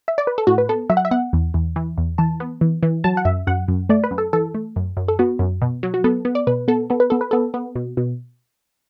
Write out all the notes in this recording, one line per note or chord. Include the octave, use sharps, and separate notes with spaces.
E5
D5
B4
A4
A2 F#4
B4
B3 A4
F#3 E5
F#5
E5
B3 F#5
E2
E2
E3
E2
E3 A5
B3
E3
E3
F#3 A5
F#5
F#2 E5
F#2 F#5
F#2
A3 D5
B4
F#2
A4
E3 A4
A3
F#2
F#2
A4
B3 F#4
F#2
B2
F#3
F#4
B3 A4
B3
D5
B2 B4
B3 A4
B3 A4
B4
B3 A4
B4
B3 A4
B3
B2
B2